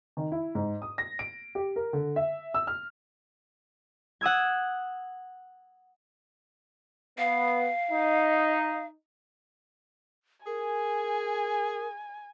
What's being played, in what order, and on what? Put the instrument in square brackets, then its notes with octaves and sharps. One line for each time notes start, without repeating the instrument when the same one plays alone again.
[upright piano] D#3
E4
G#2
D#6
A#6
D7
G4
A#4
D3
E5
E6
F6
[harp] F#5 D#6 E6 G#6
[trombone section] B3 [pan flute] F5
[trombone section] D#4
[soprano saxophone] G#4 [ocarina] A#4 [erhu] G#5